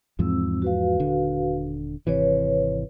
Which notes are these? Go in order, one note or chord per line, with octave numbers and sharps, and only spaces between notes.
E2 G#2 F3 C4 E6
F#4 B4 F5
D#1 D3
G#1 C3 E3 B4 C#5